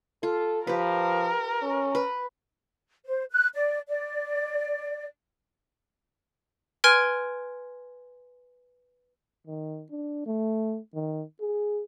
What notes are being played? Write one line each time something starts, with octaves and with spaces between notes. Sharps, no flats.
F4 A4
F3 G4 A#4 B4
C#4
B4
C5
F#6
D5
D5
B4 G#5 C6 F6 G#6 D7
D#3
D4
A3
D#3
G#4